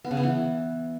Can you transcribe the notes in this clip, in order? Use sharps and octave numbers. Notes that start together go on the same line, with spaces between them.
B3
C#3
B3
E3